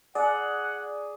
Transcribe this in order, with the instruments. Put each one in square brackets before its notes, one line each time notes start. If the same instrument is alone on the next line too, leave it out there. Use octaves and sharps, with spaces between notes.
[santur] G#4 [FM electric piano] D5 [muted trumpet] F#5